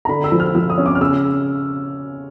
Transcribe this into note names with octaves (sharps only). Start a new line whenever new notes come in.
A#5
D3 B5
E6
F3
F6
F3 E6
D#6
C#4
D6
F6
C#3 E6